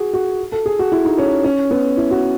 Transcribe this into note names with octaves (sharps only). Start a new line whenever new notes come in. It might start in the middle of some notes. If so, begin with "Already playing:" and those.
Already playing: F#4 G#4
F#4
A4
G#4
F#4
E4
D#4
C#4
C#4
B3
E4
F#4